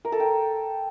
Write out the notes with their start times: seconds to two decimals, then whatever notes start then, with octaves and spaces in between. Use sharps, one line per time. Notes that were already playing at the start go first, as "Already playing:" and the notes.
0.05 A#4
0.12 A4
0.20 G5